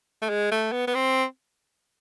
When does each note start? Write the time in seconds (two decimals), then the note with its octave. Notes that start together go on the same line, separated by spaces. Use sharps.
0.22 A3
0.29 G#3
0.52 A3
0.72 B3
0.87 B3
0.95 C4